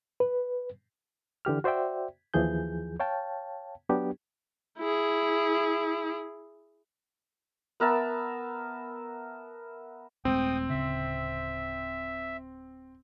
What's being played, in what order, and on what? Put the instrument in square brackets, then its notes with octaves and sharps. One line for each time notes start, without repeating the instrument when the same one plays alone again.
[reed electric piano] B4
D3 E3 G4 F6
F#4 C5 D5 E5 G5
D#2 E3 F3 G#4 G6
C#5 F5 G5 A5
F#3 B3 D4 G4
[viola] E4 G#4
[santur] B3 A#4 E5 A5
[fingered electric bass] D#1 G#3 A3 [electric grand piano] C4 [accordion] G5 D#6
[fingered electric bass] D1 C#3 [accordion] E5